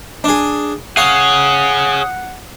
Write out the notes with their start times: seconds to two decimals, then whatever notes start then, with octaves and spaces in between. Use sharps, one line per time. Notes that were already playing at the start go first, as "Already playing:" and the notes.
0.24 D4 G#4
0.97 G#4 C#5 F5 F#5 D#6